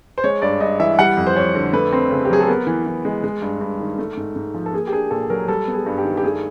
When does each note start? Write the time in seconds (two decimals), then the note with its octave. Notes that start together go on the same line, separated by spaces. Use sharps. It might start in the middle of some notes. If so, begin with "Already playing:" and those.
0.18 C5
0.24 G#3 C#5
0.42 G2 D5
0.60 G2 D#5
0.80 E3 E5
0.99 G3 F#5
1.17 F2
1.27 C5
1.36 F2 C#5
1.55 D3
1.73 A3 B4
1.93 C4
2.11 C#3
2.25 G4
2.30 F#3 G#4
2.41 A4
2.48 B3 A#4
2.67 E3
2.86 E3
3.05 G#3
3.24 G#3
3.42 G2
3.61 G2
3.80 D#3
3.99 A3
4.17 G#2
4.36 G#2
4.54 F3
4.66 A4
4.73 A#3 G#4
4.87 G4
4.92 D4 G#4
5.11 A#2 A4
5.30 F#3 A#4
5.48 G3 A4
5.67 B3
5.74 G#4
5.86 G2
5.98 G4
6.04 D#3
6.17 G4
6.23 A3 G#4